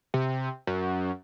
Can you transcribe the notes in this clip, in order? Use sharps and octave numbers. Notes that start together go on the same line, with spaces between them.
C3
F#2